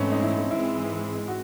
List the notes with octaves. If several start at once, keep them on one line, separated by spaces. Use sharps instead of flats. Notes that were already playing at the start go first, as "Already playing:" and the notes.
Already playing: G#2 E3 A3 C4 C#4 D#4
D#4
E4
G#2 E3 G#3 C4 E4
F#4